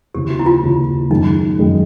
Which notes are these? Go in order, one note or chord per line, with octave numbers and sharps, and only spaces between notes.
D#2 C#3 E3 G4
F#4
E4
F4
D#2 C#3 E3
F#2 D#3 G#3 D#4
F#2 D#3 G#3